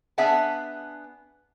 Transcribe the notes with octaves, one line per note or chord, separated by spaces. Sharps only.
B3 D4 G#4 E5 F#5 G#5